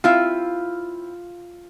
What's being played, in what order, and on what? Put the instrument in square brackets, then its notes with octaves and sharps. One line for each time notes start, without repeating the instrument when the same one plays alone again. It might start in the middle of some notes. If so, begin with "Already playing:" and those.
[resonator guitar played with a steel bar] C4 E4 F5 [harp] F4